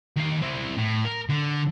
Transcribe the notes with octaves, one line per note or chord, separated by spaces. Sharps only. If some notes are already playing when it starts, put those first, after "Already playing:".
D#3 F5
C4 E4
A2
A#4
D3